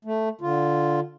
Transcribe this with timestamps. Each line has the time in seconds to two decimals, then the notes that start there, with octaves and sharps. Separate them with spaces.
0.05 A3
0.41 D3 F4